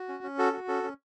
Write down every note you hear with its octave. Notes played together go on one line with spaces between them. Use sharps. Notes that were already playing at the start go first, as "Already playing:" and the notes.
Already playing: F#4
C#4
C#4
F#4 A4
F#4
C#4 A4
C#4